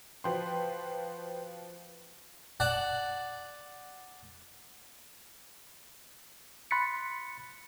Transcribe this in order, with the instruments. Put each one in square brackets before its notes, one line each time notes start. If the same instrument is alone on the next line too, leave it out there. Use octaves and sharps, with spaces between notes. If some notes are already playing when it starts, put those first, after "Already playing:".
[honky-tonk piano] F3 F#4 [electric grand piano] B4 G5 C6
[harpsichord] D5 F#5 A5
[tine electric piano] B5 C6 F#6 A6 B6 C#7